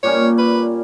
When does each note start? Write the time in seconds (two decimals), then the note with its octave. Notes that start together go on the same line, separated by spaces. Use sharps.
0.03 A#2 G3 A#3 C#4 C#5
0.38 B4